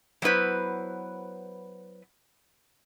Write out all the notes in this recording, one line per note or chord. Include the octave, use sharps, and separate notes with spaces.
F#3 B3 E4 B4 C5